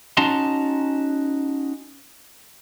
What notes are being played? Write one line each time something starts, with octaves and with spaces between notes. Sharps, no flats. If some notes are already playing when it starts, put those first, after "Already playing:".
C#4 D#4 F#4 A5 A#5 C6